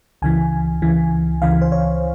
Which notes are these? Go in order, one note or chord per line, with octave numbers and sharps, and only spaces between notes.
C#2 C#3 E3 G#5
C#2 C#3 E3
C#2 C#3 E3 F5
C5
C#5